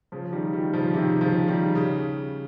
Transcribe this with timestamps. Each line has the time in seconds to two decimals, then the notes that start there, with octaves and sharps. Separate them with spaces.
0.12 C#3 F3
0.33 D#3 G3
0.53 D#3 G3
0.73 C#3 F3
0.94 C3 D#3
1.21 C#3 F3
1.48 D#3 G3
1.75 C#3